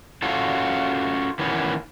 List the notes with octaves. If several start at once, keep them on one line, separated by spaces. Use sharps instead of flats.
C#4 F4 F#4 A4
D#3 E3 B3 C#4